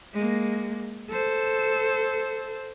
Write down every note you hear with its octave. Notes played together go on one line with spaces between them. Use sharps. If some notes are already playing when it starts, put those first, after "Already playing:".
G#3 A#3
A4 C5